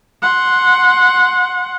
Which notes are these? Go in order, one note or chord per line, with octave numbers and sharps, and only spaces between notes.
F#5 C6